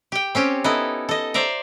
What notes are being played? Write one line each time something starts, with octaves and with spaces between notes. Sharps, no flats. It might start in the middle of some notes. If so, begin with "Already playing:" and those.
G4 G5
C4 C#4 G4
B3 D#4 E4 A4
A4 D#5
C5 D5 E5 A#5